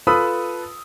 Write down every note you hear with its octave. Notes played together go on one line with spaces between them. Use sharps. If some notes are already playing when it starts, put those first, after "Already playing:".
F4 A4 B4 B5 D#6 E6